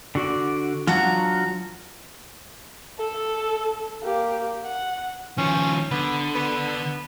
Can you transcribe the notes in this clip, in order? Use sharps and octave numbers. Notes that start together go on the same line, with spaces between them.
D3 F#4 D5
F#3 D4 F4 F#4 F#5 A#5
A4
A#3 G4
F#5
D#3 F3 C#4
D3 B3
B3